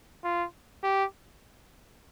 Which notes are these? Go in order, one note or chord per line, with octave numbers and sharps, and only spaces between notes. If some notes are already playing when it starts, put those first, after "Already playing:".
F4
G4